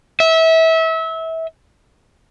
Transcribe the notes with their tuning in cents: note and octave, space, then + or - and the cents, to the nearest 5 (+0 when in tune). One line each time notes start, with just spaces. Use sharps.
E5 -25